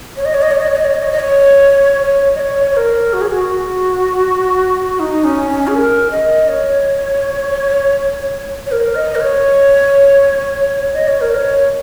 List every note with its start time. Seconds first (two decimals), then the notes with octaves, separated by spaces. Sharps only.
0.17 C#5
0.25 D#5
0.34 C#5
0.42 D#5
0.51 C#5
0.59 D#5
0.68 C#5
0.76 D#5
0.85 C#5
0.93 D#5
1.03 C#5
1.12 D#5
1.19 C#5
2.02 C#5
2.35 D#5
2.40 C#5
2.71 C#5
2.77 A#4
3.13 F#4
3.21 G#4
3.30 F#4
5.00 D#4
5.24 C#4
5.49 C#4
5.68 G#4
5.74 A#4
6.11 D#5
6.49 C#5
8.66 C#5
8.72 A#4
8.95 D#5
9.15 A#4
9.21 C#5
10.94 D#5
11.08 C#5
11.21 A#4
11.35 C#5